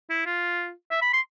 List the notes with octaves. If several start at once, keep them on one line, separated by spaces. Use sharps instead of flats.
E4
F4
E5
B5
C6